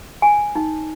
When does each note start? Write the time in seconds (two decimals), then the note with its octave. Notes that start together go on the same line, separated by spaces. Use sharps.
0.22 G#5
0.55 D#4